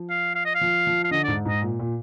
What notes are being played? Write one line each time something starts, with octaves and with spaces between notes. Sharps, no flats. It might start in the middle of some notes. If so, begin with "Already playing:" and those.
Already playing: F3
F5
F5
D#5
F5
F3
F3
F5
D3 D#5
G#2 D5
G#2 D#5
A#2
A#2